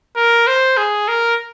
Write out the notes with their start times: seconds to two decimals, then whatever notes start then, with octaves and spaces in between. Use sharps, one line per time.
0.16 A#4
0.47 C5
0.77 G#4
1.08 A#4